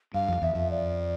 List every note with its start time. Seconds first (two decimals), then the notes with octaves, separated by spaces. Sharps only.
0.14 G2 F5
0.28 F2
0.42 E2 E5
0.55 F2
0.71 D5